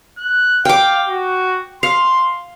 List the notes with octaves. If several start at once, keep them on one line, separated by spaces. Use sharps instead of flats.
F#6
F5 G5 D6
F#4
F5 C6